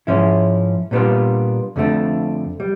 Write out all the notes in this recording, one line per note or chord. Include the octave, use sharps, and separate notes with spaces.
G#2 F3 G#3 C#4 E4
A#2 G3 B3 D4 F4
F2 D3 F3 A3 D4
G3